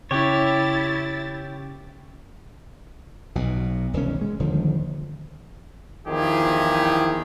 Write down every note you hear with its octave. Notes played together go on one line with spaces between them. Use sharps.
C#3 C#4 E4 G4 C#5 A6
B1 B2
E1 C2 D#3 C#4
G#3
D#1 D3 D#3 F3
E2 D#3 F3 E4 G4 G#4